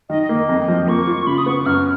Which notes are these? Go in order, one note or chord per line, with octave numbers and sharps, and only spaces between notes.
D#3 D#5
D#5
A#3
D#5
F2
F3
A#3 C#6
F4
C#3 B5
D#6
B3 C#6
F#2 F6